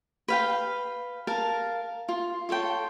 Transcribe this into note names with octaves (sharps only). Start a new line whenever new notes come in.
B4 F5 G5
A#4 F5 A5
F4
F4 A4 C#5 G5